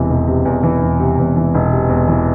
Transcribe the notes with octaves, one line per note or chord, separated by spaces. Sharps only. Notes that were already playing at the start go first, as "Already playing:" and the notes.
Already playing: E1 E2 C3 E3
E1
C3
E2
E3
E1
C3
E2
E3
E1
C3
E2
E3